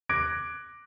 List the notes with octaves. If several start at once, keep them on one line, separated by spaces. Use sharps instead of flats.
D6 F#6 G#6 A#6 D7